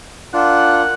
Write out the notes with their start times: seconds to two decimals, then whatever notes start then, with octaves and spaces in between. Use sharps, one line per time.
0.33 D4 F4 A#4 F#5